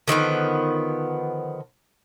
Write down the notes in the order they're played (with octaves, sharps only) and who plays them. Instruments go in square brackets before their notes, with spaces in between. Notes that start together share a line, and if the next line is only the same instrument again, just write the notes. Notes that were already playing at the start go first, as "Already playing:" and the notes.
[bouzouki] D3 D#3 F3 B3